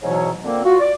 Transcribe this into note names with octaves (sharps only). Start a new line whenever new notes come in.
E2 G#2 B2 E3 F#3 C#5
A#2 D3 A#3 C4
F4 F#4
D5